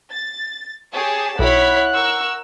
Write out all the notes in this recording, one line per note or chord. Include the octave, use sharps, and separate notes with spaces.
A6
G4 G#4 C#5 A5
B1 E4 C#5 F#5 B5 F#6 B6
A#4 C#6 E6